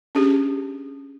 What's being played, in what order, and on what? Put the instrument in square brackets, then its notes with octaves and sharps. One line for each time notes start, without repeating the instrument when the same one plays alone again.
[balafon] C#4 D4 G4 G#4